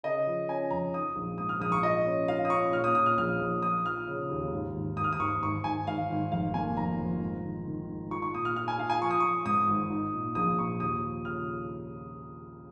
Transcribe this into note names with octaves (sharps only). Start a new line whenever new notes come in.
C#3 D#5
F3
C#4 G#5
F2 A#5
D#4 D#6
A#1
G#2 D#6
F6
A#1 D#6
C#6
F4 D#5
C#4
F4 F5
D#6
C#4 C#6
A#2 F6
D#6
A#2 D#6
F6
A#1 F6
A#1
F3 D#6
F3 F6
C#3
D#2
G#1
G#1
G#1 D#6
F6
D#6
G#1 C#6
G#1 C#6
G#1 G#5
G#1 F5
G#1
F1 F5
A#3 G#5
F2 A#5
F2
G#2
D#3
D#3
G#2
F4 C#6
C#6
A#2 D#6
F6
F4 F6
G#5
F4 F5
G#5
F3 C#6
D#6
F3 C#6
G#2 D#6
G#1
D#4
A#2
A#1 D#6
A#2 C#6
D#2 D#6
F3
C#3 F6